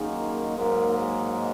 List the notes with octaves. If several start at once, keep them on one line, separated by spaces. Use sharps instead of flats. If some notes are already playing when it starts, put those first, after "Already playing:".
Already playing: F#2 D#3 A#3 D#4 G#4
G#2 F#3 A#3 D#4 A#4
G#4